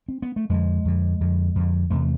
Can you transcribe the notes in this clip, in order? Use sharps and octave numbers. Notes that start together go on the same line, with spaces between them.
C4
B3
A3
F2 D3 G#3
F2 D3
F2 D3
F2 D3
E2 C3 A3